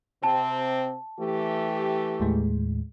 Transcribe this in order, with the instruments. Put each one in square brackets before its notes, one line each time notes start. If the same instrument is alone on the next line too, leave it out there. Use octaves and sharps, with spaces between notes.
[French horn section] C3 C4 [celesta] A5
[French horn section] E3 A3 G4
[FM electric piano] D#2 A2 G#3